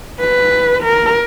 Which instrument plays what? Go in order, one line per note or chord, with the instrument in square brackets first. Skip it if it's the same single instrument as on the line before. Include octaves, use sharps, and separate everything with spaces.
[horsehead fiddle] B4
A#4